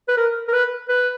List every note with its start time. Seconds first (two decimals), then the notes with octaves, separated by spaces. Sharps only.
0.08 B4
0.17 A#4
0.48 A#4
0.53 B4
0.88 B4